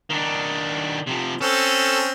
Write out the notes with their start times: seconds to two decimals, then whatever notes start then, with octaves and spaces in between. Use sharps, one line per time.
0.10 D#3 D4
1.07 C3 F3
1.41 C4 C#4 A4